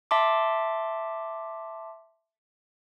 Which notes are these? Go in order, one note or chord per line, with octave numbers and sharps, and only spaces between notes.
E5 A5 C6 D6